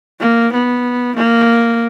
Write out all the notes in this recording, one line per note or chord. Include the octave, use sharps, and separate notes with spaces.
A#3
B3
A#3